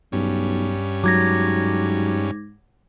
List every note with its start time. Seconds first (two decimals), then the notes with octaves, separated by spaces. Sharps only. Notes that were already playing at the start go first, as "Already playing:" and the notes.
0.12 B1 G2 C#4
1.04 G#2 F#3 D6 G#6 A#6